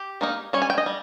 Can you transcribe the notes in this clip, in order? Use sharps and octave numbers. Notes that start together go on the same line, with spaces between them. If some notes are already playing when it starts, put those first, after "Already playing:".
Already playing: G4
D#3 A#3 D#4
G3 C#4 C#5
G#5
G5
D#5
G3